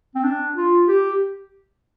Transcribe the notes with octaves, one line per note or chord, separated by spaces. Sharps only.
C4
D4
F4
G4